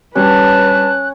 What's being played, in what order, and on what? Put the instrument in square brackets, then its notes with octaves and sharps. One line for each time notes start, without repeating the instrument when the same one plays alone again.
[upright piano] G2 G4 [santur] C#4 [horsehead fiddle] B4 A5 [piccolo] F#6